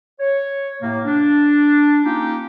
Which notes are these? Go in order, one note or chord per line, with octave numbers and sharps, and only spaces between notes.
C#5
A2 C3 A#3
D4
A#3 C#4 D#4 F4 G4